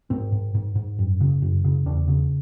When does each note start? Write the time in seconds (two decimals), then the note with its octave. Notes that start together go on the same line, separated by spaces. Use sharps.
0.10 G#2 C4
0.32 G#2
0.55 G#2
0.75 G#2
0.99 F#2
1.21 C#3
1.42 F#2
1.64 C#3
1.85 E2 D4
2.08 C#3